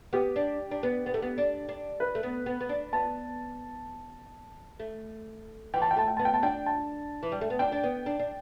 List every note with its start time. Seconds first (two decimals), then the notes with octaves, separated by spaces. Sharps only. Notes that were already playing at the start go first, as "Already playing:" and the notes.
0.13 B3 G4
0.36 D4
0.71 D4
0.83 B3
1.06 B3
1.14 A3
1.22 B3
1.38 D4
1.69 D4
2.00 B4
2.15 A3
2.23 B3
2.46 B3
2.61 B3
2.69 D4
2.93 B3 A5
4.80 A3
5.74 E3 G5
5.82 A5
5.91 G5
5.96 A3 A5
6.08 G5
6.17 B3 A5
6.25 G5
6.34 A5
6.43 D4 G5
6.66 A5
7.23 E3
7.32 G3
7.41 A3
7.50 B3
7.59 D4 G5
7.72 D4
7.84 B3
8.06 D4
8.19 D4